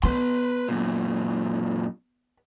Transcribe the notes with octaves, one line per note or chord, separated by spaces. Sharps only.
B3 B4 C6
F#2 A#2